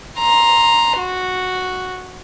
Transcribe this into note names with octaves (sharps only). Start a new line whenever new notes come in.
A#5 C6
F#4